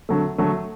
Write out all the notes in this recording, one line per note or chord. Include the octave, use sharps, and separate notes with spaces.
D3 F#3 A3
D3 F#3 A3